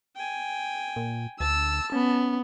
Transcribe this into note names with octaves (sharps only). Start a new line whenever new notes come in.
G5 G#5
A#2
D2 A5 E6
B3 C#4